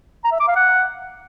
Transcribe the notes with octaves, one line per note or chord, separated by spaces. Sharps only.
A#5
E5
D6
F5
F#5